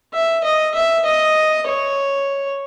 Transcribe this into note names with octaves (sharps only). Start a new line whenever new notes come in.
E5
D#5
E5
D#5
C#5